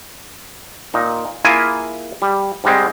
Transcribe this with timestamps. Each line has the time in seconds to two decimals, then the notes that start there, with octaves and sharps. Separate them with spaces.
0.94 A#2 D#4
1.45 A#3 E4 F4 G#4 G#5
2.22 G3
2.64 G#2 G3 G#3 C4